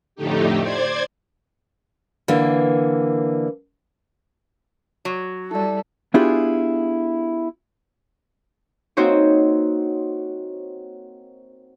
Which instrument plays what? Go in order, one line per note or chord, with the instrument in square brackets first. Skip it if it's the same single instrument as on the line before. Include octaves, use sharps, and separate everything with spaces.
[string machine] F2 A2 D3 A3 D#4 G4
C5 D5 G#6
[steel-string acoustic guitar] D3 E3 A#3
[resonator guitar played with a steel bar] F#3
[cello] G3 [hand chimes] E4 D5 [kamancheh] A4
[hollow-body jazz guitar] B3 D4 E4 F4 G4 G#4
[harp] A#3 C4 D#4 F#4 C5 C#5